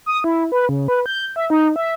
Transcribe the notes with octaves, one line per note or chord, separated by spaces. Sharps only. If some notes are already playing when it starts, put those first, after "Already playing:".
D#6
E4
B4
C#3
B4
G6
E5
D#4
E5